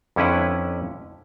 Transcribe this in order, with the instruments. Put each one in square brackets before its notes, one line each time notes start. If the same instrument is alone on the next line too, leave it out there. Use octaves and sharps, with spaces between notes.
[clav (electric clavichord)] F2 D3 C#4 E4 B4 F#5